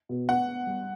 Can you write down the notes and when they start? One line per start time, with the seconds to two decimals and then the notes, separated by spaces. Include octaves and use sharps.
0.09 B2
0.28 B3 F#5
0.48 B3
0.67 G3